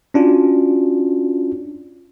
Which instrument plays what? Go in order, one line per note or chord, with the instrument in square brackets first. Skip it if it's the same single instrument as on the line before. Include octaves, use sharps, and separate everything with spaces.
[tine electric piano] C#4 D4 F4 F#4